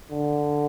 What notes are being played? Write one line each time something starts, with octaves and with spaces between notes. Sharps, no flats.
D3